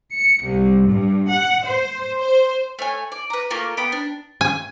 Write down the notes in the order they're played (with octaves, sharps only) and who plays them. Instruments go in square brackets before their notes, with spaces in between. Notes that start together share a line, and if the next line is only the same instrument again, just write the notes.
[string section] C#7
C2
G2
F#5
C5
C5
[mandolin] A3 C#5 G#5
D5
B4 A#5
A3 A#3 F4
B3 G5 B5
D4
[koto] G#5